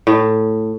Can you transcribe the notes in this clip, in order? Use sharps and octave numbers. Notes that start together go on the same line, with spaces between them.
A2